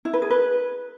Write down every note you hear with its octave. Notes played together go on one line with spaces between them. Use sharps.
E4
B4
G#4
B4